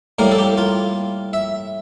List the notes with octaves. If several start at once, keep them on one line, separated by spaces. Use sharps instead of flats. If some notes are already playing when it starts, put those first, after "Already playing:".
A2 G3 A#3 A#4
A4
G4
F4
E5